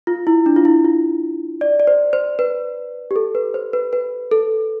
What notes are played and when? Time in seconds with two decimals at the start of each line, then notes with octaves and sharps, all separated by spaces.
0.07 F4
0.27 E4
0.46 D4
0.56 F4
0.65 E4
0.85 F4
1.61 D5
1.80 D5
1.87 C5
2.13 C5
2.39 B4
3.11 G4
3.16 A4
3.35 B4
3.54 C5
3.73 B4
3.93 B4
4.31 A4